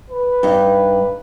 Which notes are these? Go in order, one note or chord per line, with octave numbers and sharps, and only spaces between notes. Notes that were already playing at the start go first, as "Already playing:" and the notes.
B4
G2 D#4